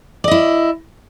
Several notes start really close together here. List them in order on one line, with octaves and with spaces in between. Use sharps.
D5 D#5 E4